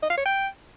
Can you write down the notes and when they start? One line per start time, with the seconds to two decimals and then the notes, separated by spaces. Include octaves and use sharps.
0.02 D#5
0.10 F5
0.18 C#5
0.25 G5